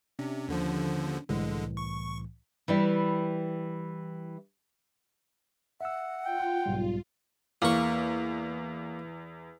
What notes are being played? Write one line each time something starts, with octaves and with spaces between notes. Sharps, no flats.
C3 C#4 D4
D#2 D3 F3
C2 A2 D3 E3 G#3
C#6
E3 G3 E4
E5 F#5 E6
F4 G5
B1 G#2 G3
E2 A#3 C#6